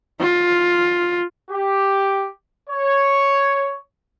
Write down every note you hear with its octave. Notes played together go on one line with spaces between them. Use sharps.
F4
G4
C#5